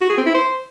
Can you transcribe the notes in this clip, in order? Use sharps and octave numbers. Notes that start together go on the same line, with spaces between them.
F#4
G#4
C4
E4
C5